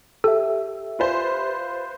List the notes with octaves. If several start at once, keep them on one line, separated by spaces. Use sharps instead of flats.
G4 A4 E5
F4 B4 C5